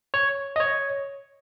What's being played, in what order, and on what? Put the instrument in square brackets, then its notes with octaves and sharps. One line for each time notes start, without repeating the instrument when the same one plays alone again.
[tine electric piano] C#5
D#5
C#5